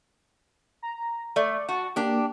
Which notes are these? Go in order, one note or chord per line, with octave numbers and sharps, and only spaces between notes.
A#5
A3 D5
F#4 A5
A#3 D4 G4